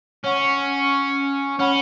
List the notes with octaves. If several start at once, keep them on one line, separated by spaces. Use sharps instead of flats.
C#4 C#5 F#5 C#6
C#4 C#5 F#5 B5